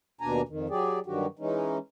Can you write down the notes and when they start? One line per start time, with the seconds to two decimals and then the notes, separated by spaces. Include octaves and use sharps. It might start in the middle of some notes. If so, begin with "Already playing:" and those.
0.21 D#2 B2 D4 G#5 A#5
0.49 F2 D#3
0.70 F#3 G4 G#4 D5
1.06 G2 D3 D#3 F#3 F#4 G4
1.39 E3 G#3 C#4 D#4